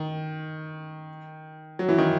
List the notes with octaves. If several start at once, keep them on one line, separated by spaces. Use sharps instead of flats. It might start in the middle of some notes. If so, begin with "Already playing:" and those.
Already playing: D#3
F#3
E3
D#3